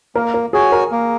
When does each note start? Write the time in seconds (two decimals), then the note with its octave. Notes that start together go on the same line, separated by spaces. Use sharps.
0.15 A#3 A#4
0.34 A#4
0.53 F#4 G#4 C#5 G#5
0.72 A#4
0.91 A#3